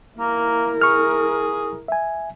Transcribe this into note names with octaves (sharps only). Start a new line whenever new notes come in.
A#3 E4 A#4
G#4 C#6 F6
E5 G#5